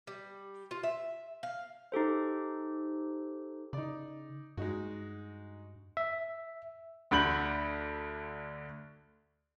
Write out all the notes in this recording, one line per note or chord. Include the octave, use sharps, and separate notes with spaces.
G3
F4
E5
F5
D#4 G4 A4 C5
C#3 D#4 D5
G2 G#3 D#4 F#4
E5
D2 D3 B5 G6 F#7